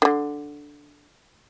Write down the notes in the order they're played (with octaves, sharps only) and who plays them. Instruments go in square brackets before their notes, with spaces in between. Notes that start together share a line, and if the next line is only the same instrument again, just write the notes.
[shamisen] D3 D#3